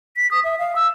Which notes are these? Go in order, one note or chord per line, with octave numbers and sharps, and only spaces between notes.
B6
D#6
E5
F5
E6